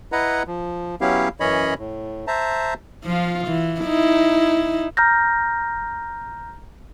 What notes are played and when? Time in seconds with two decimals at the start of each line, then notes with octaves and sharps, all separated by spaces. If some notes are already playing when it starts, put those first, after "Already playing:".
0.12 E4 B4 D#5 F#5 A#5
0.47 F3
1.01 F#3 B3 C#4 E4 G4 F5
1.40 F#2 E3 C#4 C#5 D#5 B5
1.79 A2
2.27 C5 E5 A5 A#5
3.04 F3 F4
3.47 E3
3.80 D#4 E4
4.97 A#5 F6 G6 A#6